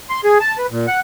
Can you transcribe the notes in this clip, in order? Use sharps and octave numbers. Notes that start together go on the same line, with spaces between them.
C6
G#4
A5
B4
A#2
F#5